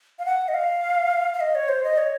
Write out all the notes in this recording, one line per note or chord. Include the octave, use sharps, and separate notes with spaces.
F5
F#5
D#5
F5
F5
D#5
C#5
C5
D#5
C#5